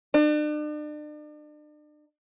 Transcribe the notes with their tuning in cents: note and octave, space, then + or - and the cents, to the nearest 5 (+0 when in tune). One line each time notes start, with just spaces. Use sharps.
D4 +40